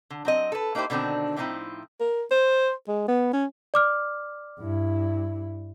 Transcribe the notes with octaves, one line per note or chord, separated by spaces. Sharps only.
D3
F#3 C4 D#5
A4 B4
A#3 D#4 E4 G4 C5
B2 D3 D#3 C4 D4
A2 D3 F3 C4 D#4 E4
A#4
C5
G#3
B3
C#4
D5 D6 F6
G2 E4